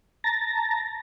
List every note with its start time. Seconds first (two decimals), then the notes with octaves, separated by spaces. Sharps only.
0.24 A5 A#5 A6 A#6